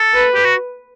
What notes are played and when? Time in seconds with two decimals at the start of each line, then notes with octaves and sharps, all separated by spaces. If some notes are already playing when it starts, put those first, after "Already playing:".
Already playing: A4
0.13 B4
0.34 G4
0.44 F#4